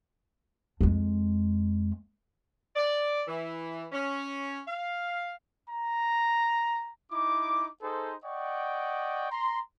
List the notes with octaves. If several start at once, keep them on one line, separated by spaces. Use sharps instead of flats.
F2 G#3
D5
E3
C#4
F5
A#5
D#4 E4 D6
D#4 G#4 A4 C5
D5 D#5 F#5 G5 C#6
A#5 C6